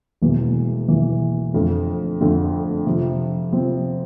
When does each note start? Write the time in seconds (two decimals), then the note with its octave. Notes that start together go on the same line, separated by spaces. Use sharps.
0.22 E1 E2 E3 A#3 E4
0.88 E1 E2 E3 A#3 E4
1.53 F2 D3 A3
2.21 F2 D3 A3
2.87 C3 F3 C4
3.52 C3 F3 C4